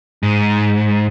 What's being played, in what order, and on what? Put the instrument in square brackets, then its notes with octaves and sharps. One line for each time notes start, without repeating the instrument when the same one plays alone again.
[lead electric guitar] G#2